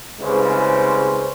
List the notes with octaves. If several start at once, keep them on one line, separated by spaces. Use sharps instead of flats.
C2 C#3 G#3 B4 C5